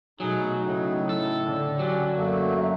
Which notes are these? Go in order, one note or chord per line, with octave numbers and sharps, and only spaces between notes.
B2 F#3 A3 D#4 G#4
A2 C#3 D#4
A4
D3
F#3 C#4 G4
F#2 A3 A#3